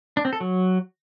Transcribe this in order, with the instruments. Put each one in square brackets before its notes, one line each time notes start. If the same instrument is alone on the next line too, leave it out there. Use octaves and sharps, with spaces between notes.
[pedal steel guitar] D4
C4
A4
F#3